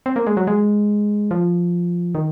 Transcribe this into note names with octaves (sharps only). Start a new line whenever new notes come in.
C4
A#3
G#3
F#3
G#3
F3
D#3